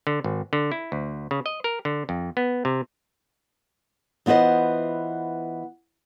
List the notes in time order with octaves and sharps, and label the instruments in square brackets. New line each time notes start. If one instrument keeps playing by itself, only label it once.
[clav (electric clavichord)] D3
G#1
D3
E4
D2
C#3
D#5
A#4
D3
F2
B3
C3
[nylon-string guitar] E3 B3 F4 C5 D#5